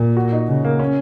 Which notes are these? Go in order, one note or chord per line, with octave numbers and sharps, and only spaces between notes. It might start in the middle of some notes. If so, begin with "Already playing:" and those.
Already playing: A#2
F#4
D#4
C#3
A#3
C#4